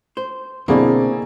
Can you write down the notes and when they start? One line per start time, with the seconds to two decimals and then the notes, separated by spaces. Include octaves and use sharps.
0.17 C5
0.68 B2 D3 A#3 C4 E4 G#4 D5